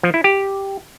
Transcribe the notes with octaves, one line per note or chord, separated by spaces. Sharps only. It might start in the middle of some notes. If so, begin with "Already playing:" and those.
F3
E4
G4